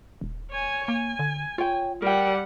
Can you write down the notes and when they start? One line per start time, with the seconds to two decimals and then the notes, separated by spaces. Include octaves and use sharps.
0.21 D#1
0.51 C#5 G#5
0.88 A#3 G#5
1.19 D3
1.58 F4 C#5 G5
2.02 G3 A#4 F#5 G5